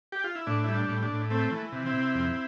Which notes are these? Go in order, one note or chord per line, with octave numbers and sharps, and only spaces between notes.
G4
F4
E4
A2 D4
G3 E4
D4
A2
D4
A2
A3 C4
E3
C3
C4 E4
C3
F2